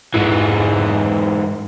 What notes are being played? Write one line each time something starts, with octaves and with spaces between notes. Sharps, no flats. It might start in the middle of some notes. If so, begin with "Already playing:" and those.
G#2 E3